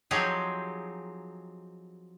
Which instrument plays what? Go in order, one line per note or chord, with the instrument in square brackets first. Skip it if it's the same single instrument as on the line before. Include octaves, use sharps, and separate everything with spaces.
[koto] F3 F#3 C4 D#4 G4 G#4